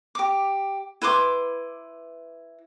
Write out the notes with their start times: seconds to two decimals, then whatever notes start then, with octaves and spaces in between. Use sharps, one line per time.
0.15 G4 D6
1.02 E4 B4 C6 D6